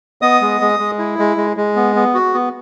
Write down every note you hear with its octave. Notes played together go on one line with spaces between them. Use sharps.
B3 D#5 D#6
G#3
G#3
G#3
E4
G#3
G#3
G#3
B3
B3
F#4
B3